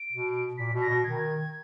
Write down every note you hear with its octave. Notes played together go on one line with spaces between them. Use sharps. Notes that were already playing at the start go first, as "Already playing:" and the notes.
Already playing: D7
B2
A#2 B6
B2
A#6
B2
D#3 G#6